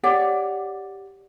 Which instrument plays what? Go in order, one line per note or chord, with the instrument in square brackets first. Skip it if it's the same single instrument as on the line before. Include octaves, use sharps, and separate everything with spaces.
[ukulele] G4 C#5 D5 F#5